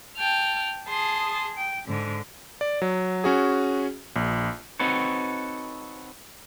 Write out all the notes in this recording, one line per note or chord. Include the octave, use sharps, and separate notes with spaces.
G5 A5 F6
G#4 A5 C6 D#6
G5
G#2 D3
D5
F#3
C#4 F#4 G#4
A#1
C4 D#4 F#4 A4 B4 C#5